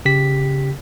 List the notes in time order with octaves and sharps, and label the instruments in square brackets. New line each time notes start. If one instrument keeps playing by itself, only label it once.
[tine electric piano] C#3 G4 B6